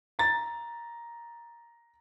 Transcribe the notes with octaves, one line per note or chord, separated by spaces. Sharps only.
A#5 A6